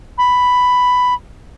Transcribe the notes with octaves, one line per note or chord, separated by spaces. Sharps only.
B5